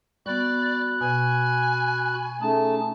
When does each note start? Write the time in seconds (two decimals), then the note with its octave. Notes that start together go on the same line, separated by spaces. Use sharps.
0.26 G3 B3 F#4 D5 B5 F#6
1.01 B2 G#5
2.41 A3 C#4 D#4 G#4 A5